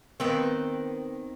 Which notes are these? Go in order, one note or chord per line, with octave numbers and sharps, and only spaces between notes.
D#3 B3 C4